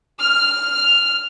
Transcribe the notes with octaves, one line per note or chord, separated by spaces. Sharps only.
F6